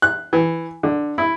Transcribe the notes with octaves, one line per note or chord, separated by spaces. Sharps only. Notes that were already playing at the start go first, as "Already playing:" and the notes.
F#6
E3
D3
E4